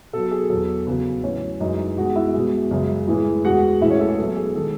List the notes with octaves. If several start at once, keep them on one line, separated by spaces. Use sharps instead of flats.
B2 F#3 A4
G#4
E2 B2 F#3 A4
E2 C#3 F#3 B3 B4
A2 F#3 C#4 C#5
F#2 E3 G#3 D#4 D#5
B2 G#3 F#4 F#5
E4 E5
B2 G#3
F#2 C#3 G#3
A2 E3 G#3
E2 B2 G#3 F#4 F#5
A2 E3 G#3 E4 E5
C#4 C#5
A4
G#4
B2 F#3 A4
G#4
D#3 G#3 A4